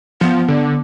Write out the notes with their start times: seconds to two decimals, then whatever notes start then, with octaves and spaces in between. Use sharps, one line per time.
0.21 F3 B3
0.48 D3